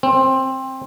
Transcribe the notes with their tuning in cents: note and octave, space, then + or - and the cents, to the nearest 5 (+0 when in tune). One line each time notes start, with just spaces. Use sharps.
C4 +15